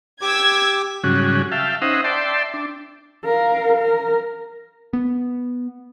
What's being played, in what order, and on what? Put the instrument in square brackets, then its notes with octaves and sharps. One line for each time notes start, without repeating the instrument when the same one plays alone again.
[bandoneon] G4 D6 [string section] E6 G#6
[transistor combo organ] G#2 C#3 F#3 G3 C#4 F#4
E5 F5 G5 A5
C#4 D#4 C5 D#5 E5 F#5
D5 E5 G5 A5 C6
D4
[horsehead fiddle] A#4 F5
A#4
[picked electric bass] B3